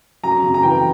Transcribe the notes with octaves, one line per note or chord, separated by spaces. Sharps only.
F#2 A#5
C#3
A#5
E3 G5